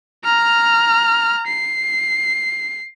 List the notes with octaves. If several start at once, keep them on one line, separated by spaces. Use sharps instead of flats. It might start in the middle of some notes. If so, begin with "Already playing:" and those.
A#5 F6
C7